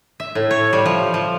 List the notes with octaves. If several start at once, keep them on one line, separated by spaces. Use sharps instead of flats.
E5
A2
C#5
G3
F3
F3